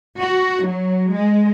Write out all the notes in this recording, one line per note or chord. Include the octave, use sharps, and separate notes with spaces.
F#4
F#3
G#3